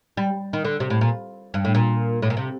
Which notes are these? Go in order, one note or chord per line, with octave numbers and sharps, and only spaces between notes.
G3
D#3
D3
C3
A2
A#2
G2
A2
A#2
A2
A#2
C3